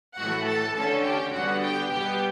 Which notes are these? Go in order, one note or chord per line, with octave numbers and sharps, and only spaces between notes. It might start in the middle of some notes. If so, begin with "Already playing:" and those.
A2 E3 A3 F#4 F#5
A4 A5
D3 A3 C#4 A4 A5
G4 G5
D3 G3 B3 F#4 F#5
G4 G5
B2 G3 B3 G4 G5